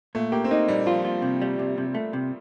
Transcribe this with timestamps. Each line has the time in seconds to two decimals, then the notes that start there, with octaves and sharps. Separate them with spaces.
0.15 A#2 A3
0.32 A#3 G4
0.44 C4
0.51 A#3 D#4
0.68 A#2 G3
0.86 F3 F4
1.05 F4
1.22 C3
1.41 G3
1.59 C3
1.78 C3
1.95 A3
2.13 C3